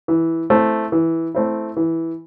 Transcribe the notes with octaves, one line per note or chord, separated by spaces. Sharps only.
E3
A3 C4 E4
E3
A3 C4 E4
E3